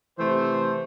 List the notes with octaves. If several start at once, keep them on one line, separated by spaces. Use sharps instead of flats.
C3 E3 A3 C5